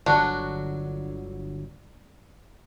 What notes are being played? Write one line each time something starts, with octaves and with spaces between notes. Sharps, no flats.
G1 D3 F#3 D4 F#4